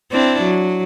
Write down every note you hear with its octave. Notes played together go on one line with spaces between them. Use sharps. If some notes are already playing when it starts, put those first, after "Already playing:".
C4 D4 E4
F#3